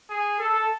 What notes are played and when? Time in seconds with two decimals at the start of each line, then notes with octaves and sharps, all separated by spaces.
0.09 G#4
0.39 A4